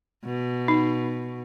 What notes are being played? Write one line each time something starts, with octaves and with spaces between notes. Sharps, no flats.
B2
D#4